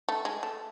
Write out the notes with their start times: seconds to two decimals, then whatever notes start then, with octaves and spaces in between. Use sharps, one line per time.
0.09 A3
0.25 G#3
0.43 A3